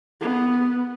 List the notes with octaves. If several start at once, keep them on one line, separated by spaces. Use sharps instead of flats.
B3